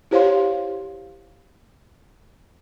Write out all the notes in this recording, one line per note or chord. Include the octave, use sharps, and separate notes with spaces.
E4 G4 C5 C#5 F5 C6